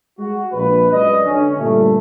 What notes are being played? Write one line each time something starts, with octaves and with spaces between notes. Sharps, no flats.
G#3 F#4
A#1 B4
F#2 G#3 B4 D5 D#5
D3 C#4
G2 A#2 D3 G3 A3